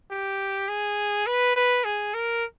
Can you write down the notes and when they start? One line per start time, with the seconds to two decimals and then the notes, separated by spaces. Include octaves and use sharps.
0.11 G4
0.68 G#4
1.26 B4
1.56 B4
1.84 G#4
2.14 A#4